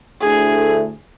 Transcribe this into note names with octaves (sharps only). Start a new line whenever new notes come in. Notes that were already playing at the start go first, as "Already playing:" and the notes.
D2 D3 A3 E4 G#4